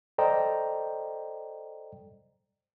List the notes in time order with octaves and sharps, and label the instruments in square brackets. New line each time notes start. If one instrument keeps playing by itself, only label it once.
[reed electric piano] A4 C5 D5 D#5 G5 A#5